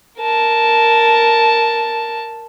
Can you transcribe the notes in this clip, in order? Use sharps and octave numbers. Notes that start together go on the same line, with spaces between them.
A#4 A5